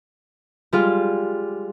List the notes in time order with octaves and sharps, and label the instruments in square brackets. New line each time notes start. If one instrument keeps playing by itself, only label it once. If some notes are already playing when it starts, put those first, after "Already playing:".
[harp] G3 G#3 F4